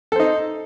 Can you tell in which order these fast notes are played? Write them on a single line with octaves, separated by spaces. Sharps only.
A4 C5 D#4